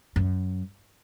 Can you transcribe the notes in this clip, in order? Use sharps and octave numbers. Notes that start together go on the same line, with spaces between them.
F#2